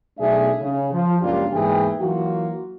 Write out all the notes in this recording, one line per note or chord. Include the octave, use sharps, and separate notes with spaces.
B1 B2 A3 D4 G#4 E5
C#3
F3
C#2 F#2 A#3 D4 F4 G4
E2 G#2 E3 A#3 G#4 G5
E3 F#3 A#3 F4 F#4